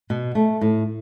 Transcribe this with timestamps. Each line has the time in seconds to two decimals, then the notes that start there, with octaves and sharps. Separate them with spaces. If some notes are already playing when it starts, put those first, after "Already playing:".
0.10 B2
0.35 A3
0.61 A2